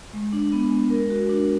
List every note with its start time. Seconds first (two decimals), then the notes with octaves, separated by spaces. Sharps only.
0.13 G#3
0.33 D4
0.52 B3
0.71 G#3
0.90 A#4
1.10 F#4
1.29 D4